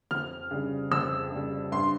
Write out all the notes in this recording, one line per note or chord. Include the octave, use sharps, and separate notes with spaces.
F2 F6
C#3 G3
F2 E6
C#3 G3
G2 C6